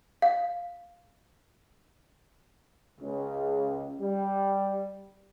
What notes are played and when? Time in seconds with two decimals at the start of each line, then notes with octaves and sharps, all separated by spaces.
0.22 F5
3.01 C#2
4.00 G3